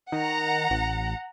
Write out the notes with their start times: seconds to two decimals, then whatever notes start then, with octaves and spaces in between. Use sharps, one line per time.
0.12 D#3 F#5 A#5
0.70 A1